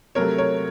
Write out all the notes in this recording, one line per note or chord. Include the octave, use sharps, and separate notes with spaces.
C3 F#3 A3 A#4 C#5
A#4 C#5